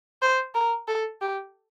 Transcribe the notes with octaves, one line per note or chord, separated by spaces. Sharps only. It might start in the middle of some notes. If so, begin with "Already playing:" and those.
C5
A#4
A4
G4